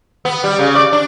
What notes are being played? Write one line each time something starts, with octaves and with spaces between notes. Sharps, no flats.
B3
G3
C#3
D5
D4